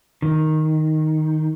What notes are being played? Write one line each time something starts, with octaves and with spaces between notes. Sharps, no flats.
D#3